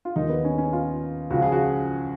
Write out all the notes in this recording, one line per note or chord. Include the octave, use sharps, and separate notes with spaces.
F4
D#2 D#3 D#4
B3
C#4
C#4
F4
C#2 C#3 F3 F#4
G#4
F#4